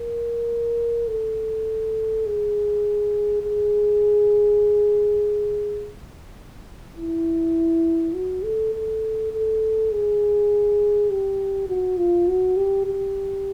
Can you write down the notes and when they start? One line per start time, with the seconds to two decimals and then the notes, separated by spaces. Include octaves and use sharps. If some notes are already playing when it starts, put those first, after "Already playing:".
Already playing: A#4
1.08 A4
2.26 G#4
3.43 G#4
6.97 E4
8.15 F#4
8.44 A4
8.74 A4
9.33 A4
9.91 G#4
11.10 G4
11.69 F#4
11.98 F4
12.28 F#4
12.57 G4
12.87 G4